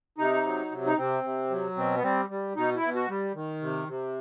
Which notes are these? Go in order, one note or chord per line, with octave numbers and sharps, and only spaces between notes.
C3 D#4
F#3
C3
D#4
C3 C4
C3
F#3
B2 C4
B3
G3 C4
G3
B2 D#4
E4
B2
F#4
G3
D#3
C3
C3